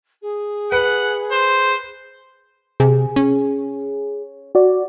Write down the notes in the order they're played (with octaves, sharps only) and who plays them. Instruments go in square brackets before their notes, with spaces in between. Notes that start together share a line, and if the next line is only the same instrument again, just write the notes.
[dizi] G#4
[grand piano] B4 [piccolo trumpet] F#5
[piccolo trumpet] C5
[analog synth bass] C3 [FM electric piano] G#4
[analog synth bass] C#4
[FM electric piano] F#4 D5